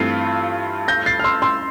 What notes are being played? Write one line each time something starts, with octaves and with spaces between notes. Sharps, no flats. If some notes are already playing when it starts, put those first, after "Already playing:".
Already playing: G2 E3 A3 C4 F4 C7
G6 A#6
A6 C7
F6
C6 E6
C6 E6